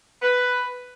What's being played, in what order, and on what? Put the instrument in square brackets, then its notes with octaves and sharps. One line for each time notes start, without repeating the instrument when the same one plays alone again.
[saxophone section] B4